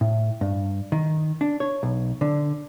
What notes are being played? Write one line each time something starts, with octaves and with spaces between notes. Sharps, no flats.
A2
G2
D#3
D4
C#5
B1
D3